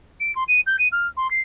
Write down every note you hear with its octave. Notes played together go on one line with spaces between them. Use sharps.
D7
C6
D#7
G6
D#7
F6
C6
C7